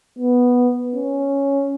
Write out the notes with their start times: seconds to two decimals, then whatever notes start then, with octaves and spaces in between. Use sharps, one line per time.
0.19 B3
0.95 C#4